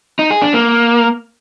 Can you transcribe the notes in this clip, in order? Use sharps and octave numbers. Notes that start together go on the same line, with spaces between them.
D#4
G#4
D4
A#3